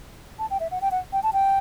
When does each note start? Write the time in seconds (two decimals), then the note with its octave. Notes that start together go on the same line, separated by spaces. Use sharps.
0.39 A5
0.50 G5
0.60 E5
0.71 F#5
0.81 G5
0.91 F#5
1.13 G5
1.23 A5
1.33 G5